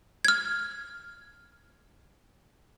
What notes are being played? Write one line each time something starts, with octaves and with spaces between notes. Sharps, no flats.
F6 G#6